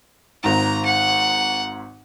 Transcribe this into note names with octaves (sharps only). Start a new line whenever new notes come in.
G#1 G#2 A#5
F#5